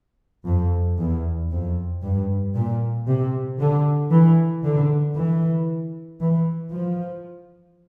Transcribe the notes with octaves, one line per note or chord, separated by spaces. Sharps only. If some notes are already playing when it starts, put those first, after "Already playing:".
F2
E2
F2
G2
A#2
C3
D3
E3
D3
E3
E3
F3